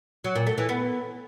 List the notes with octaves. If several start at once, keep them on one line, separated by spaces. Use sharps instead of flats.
F#3
A#2
A3
E3
B3